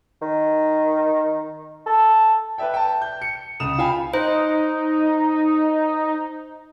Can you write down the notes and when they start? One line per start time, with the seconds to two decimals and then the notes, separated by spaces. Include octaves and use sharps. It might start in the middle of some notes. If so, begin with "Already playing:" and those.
0.22 D#3
1.87 A4
2.58 B4 D5 E5 G5
2.74 G5 A5
3.01 G6
3.22 C#7
3.60 C#2 D#6 E7
3.78 F4 F5 G5 G#5 B5
4.14 D#4 C5